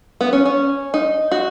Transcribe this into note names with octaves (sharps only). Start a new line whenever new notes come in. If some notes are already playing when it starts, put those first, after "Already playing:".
B3
C#4
C#4
D#4
F#4